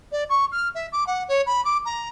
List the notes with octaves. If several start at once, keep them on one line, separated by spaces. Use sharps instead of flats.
D5
C#6
F6
E5
D6
F#5
C#5
B5
D6
A#5